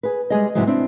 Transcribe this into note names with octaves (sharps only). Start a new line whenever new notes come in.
G#4 B4
G3 G#3 G#4 D#5
G#2 C3 E3 F#3 G#3
C4 D4 E4